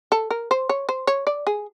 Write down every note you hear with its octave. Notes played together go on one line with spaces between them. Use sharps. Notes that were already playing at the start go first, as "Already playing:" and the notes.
A4
A#4
C5
C#5
C5
C#5
D5
G#4